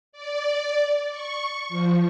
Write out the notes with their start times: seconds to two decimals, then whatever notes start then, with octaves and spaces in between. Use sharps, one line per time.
0.13 D5
1.11 C#6
1.69 F3